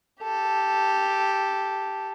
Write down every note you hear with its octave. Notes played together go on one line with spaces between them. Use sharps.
G4 A4